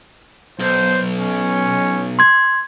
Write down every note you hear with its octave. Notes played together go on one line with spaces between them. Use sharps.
B1 C5
C#4
C6 G#6